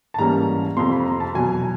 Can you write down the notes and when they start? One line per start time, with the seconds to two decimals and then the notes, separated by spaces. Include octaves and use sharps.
0.14 A5
0.18 G#2 E3 G3 A#3 C#4 A#5
0.77 F2 C3 F3 C6
0.92 B5
1.06 A#5
1.20 A5
1.35 E2 B2 F#3 G#5